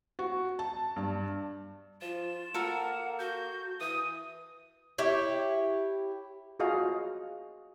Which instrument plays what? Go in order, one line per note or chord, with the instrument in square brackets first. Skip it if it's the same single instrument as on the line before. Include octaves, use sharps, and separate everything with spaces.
[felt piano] F#4
A5
G2
[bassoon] F3 [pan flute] F4 [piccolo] E7
[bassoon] A#3 [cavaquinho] A4 A#4 [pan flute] F#5
[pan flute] F#4 [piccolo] G6
[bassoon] E3 [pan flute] D#6 [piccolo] D#7
[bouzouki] E4 G4 C#5
[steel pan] F4 F#4 G#4 D#5 F5